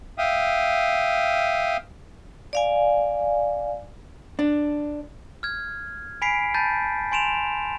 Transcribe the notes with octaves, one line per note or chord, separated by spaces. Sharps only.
E5 F5 G5 D#6
D5 F5 G#5
D4
F6 G#6
G#5 B5 B6 C7 D7
A5 B5 G6 A6
G#5 C6 D7 E7 F7